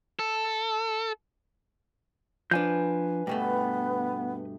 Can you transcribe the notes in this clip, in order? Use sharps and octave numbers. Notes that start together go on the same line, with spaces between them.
A4
F3 D4 B4 G#5 G6
G2 B2 A3 B3